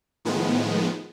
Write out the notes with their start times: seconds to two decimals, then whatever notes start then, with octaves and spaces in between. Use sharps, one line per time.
0.25 A2 D#3 F3 G#3 B3